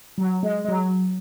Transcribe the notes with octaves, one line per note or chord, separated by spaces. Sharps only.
F#3
G#3
G#3
F#3